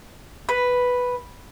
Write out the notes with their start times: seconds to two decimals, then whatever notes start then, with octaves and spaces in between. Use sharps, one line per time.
0.49 B4